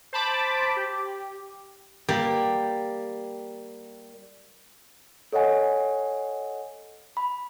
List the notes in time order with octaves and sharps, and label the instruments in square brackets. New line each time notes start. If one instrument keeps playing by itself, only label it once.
[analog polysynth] C5 A5 B5 D6
G4
[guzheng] G3 A#3 G4
[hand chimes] A4 C#5 D#5 F#5 G#5
B5